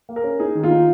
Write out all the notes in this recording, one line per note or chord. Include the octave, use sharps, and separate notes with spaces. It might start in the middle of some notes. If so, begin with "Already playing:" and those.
A#3
A#4
C#4
D#4 G#4
D#3
F4
D#4